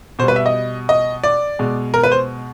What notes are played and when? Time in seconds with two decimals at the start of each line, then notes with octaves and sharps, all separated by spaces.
0.19 B2 C5
0.23 G3 B4
0.36 E5
0.46 D#5
0.89 D#5
1.24 D5
1.59 B2 G#3
1.94 A#4
2.03 B4
2.12 C5